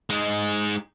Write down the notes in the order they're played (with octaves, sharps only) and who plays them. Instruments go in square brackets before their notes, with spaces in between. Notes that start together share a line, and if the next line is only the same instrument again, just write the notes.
[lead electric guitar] G#3 D#4